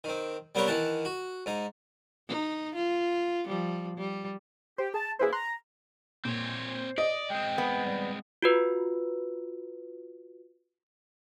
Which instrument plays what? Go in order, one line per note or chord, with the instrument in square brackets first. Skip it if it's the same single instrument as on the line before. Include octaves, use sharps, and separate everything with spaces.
[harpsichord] D#3 C4
G3 B3 C4 A#4 B4 C#5
D#3 E3 F#5 A5
F#4
G#2 D#4
[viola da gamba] D#4
F4
F3 G3
G3
[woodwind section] G4 [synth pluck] C5
[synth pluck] G#4 [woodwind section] A5
[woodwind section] F#2 A#3 E4 [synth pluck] G#4 B4 C5
[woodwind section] A#5 [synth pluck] C6 F#6
[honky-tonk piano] A#2 [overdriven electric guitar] C4 C#5
[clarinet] C5
[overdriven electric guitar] D5 [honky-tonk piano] D#5
[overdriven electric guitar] G#3 C4 [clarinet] G5
[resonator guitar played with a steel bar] B3
[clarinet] G3
[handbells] F4 F#4 B4